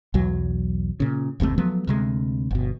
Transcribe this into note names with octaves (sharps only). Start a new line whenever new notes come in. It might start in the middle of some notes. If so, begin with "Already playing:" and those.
B1 E2 F#3
A#2 C#3
F#1 D#2 C3 A3
F3 F#3 A3 B3
D2 C3 G#3
G1 B2